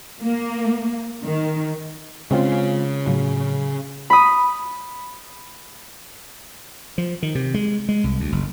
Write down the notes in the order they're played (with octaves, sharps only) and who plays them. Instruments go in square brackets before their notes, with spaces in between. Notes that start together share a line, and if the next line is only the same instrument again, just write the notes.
[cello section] A#3
D#3
[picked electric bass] C#3 C#4 [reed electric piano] G#3 C4 F4
[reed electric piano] A2 F#3 [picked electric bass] C#3
[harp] B5 D#6
[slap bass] F3
D#3
C3
G#3
G#3
C2
D2
F#1